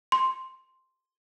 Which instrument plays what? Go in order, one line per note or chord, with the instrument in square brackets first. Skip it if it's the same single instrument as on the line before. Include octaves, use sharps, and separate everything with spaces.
[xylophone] C6